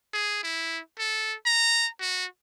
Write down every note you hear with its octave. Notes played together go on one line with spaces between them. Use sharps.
G#4
E4
A4
A#5
F#4